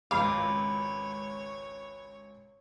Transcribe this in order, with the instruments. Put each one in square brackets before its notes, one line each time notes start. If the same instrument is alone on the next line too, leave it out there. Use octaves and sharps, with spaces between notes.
[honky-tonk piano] G#1 C#2 D6 [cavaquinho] B4 A#5 [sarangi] C#5 [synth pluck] F5